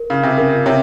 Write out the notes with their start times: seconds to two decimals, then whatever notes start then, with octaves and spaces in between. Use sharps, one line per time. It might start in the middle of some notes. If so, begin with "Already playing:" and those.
Already playing: A#4
0.10 C#3 F5
0.23 C3
0.37 C#3 A#4
0.66 C3 C#5